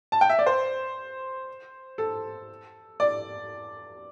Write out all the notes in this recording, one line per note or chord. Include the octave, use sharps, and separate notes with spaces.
A5
G5
E5
D5
C5
A4
D5